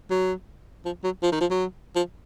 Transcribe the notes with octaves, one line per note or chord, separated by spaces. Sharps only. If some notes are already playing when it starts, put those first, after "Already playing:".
F#3
F3
F#3
F3
D#3
F3
F#3
F3